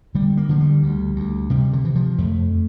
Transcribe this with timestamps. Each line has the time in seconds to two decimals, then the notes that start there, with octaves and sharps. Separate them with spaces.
0.15 D3 G3
0.37 A#3
0.49 D3 F3
0.61 G3
0.83 D2
1.16 D2
1.50 C3 G3
1.73 D3
1.84 C3 E3
1.95 F3
2.18 F2 A3